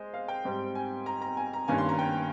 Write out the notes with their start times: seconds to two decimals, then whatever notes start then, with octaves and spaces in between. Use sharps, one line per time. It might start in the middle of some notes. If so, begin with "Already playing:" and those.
Already playing: G#3 C5 D#5
0.14 F5
0.28 G5
0.45 G#2 G3 C4
0.75 G#5
1.06 A#5
1.22 A#5
1.37 G#5
1.53 A#5
1.68 G2 D#3 A#3 C#4 G#5
1.78 C6
1.89 A#5
1.99 G5